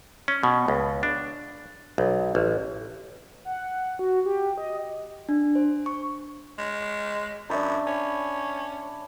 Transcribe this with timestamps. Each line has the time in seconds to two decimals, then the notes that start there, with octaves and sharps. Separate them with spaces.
0.28 C#4
0.43 B2
0.68 C#2
1.03 D4
1.98 B1
2.35 A1
3.45 F#5
3.99 F#4
4.26 G4
4.58 D#5
5.29 D4
5.55 C5
5.86 C#6
6.58 G#3
7.50 F#2 D4 E5 B5
7.86 C#4